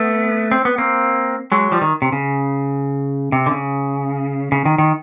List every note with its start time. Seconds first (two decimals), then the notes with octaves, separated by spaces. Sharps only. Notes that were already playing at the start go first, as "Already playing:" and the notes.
Already playing: A3 B3
0.51 C4
0.65 B3
0.78 A#3 C4
1.52 F#3 G#3
1.72 F3 G3
1.81 D#3
2.02 C3
2.12 C#3
3.32 C3
3.46 D3
3.51 C#3
4.52 C#3
4.65 D#3
4.78 D#3